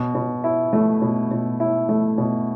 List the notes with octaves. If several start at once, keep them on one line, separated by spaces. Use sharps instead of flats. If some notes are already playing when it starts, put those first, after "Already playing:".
Already playing: B2
B2
E4
A3
B2
B2
E4
A3
B2